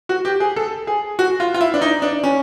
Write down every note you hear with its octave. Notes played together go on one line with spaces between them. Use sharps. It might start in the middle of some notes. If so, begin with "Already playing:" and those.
F#4
G4
G#4
A4
G#4
F#4
F4
F4
E4
D4
D#4
D4
C#4